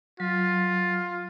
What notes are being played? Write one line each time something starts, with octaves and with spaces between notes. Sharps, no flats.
F#3 F4